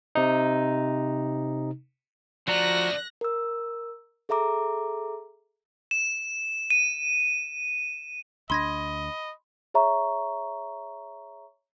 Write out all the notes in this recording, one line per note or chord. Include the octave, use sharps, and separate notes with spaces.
C3 D#4
D3 F3 A3 F#4 D5 A#5 F#6 A#6
A#4 E6
G#4 A4 E5 A#5 D6
E7
D#7
D2 D4 D#5 B5 C6 G#6 A#6
G#4 C#5 E5 A#5 C#6